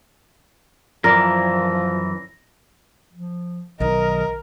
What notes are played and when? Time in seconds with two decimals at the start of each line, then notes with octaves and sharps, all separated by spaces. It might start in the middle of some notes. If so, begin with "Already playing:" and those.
1.04 F#2 E3 F3 A#4 D5 A#6
3.13 F3
3.80 B1 D#3 A#4 D#5